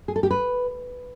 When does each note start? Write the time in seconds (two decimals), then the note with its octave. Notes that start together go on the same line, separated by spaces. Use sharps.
0.08 G#4
0.16 A4
0.23 G4
0.31 B4